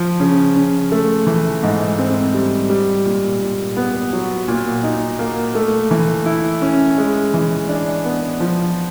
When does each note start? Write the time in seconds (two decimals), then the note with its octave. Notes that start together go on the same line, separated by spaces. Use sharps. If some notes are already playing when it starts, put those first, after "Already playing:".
Already playing: F3
0.20 C#3
0.56 C#3
0.92 A3
1.27 E3
1.63 G#2
1.99 C4
2.34 G3
2.70 G3
3.05 A#2
3.42 A#2
3.77 B3
4.13 F#3
4.48 A#2
4.84 D#4
5.19 A#3
5.55 A3
5.91 E3
6.26 E4
6.62 C#4
6.98 G#3
7.34 E3
7.69 D4
8.05 B3
8.40 F3